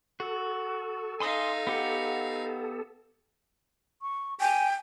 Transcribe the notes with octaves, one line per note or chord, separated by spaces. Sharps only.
F#4 A4
D#4 F5 G#5 C6 D#6
B3 G4 F#5
C#6
G5 G#5